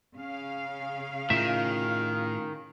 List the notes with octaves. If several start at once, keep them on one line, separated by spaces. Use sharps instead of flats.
C#3 F5
A2 D#3 F4 E5